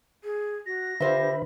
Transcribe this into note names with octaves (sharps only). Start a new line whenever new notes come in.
G#4
F#4 A#6
D3 F4 G4 B4 C5 E5